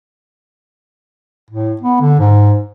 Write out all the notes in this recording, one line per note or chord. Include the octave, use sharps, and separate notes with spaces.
A2
B3
D3
G#2